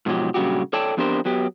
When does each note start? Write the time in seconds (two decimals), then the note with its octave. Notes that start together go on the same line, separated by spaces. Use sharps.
0.06 G#2 B2 F3 F#3 G4
0.34 G2 A#2 C#3 F#3 F#4 G4
0.73 A4 C#5 D5 G5 A5
0.97 F2 B3 D4 G4 A#4 C5
1.25 F#3 B3 G4